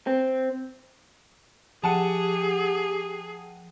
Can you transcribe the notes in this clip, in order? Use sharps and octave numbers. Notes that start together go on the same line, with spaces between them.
C4
F3 G4 G#4 F#5 G5 A5 D#7